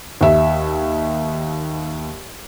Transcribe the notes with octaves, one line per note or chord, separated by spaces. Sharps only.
D#2 E5